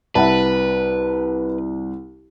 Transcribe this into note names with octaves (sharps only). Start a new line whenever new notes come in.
C2 B4 E5 F#5 A5